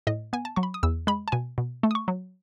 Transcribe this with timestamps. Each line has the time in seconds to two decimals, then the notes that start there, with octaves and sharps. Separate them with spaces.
0.07 A2 D#5
0.33 B3 G#5
0.45 A5
0.56 F#3 C#6
0.63 B5
0.74 D#6
0.83 E2 E6
1.07 G#3 B5
1.28 A5
1.32 B2 G#5
1.58 B2
1.83 A3
1.91 D#6
1.95 C#6
2.08 F#3